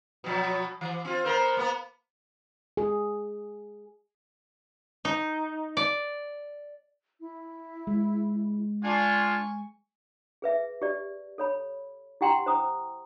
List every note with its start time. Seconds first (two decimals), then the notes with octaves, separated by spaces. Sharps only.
0.24 B2 F3 F#3
0.81 E3
1.05 C4 F4
1.24 B3 A#4 C5
1.57 A#3 B3
2.77 G#4
5.05 D#4
5.77 D5
7.20 E4
7.87 G#3
8.83 D4 F4 G#5 C#6 G#6
10.42 G#4 B4 E5
10.82 G4 D5
11.38 A4 C#5 B5
12.21 E4 G4 F#5 G5 A#5 C6
12.46 C5 A#5 D#6